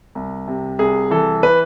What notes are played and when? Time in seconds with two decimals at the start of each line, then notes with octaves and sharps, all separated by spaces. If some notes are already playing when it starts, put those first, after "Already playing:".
0.15 C2
0.48 C3
0.79 C2 G#4
1.11 E3 A4
1.43 B4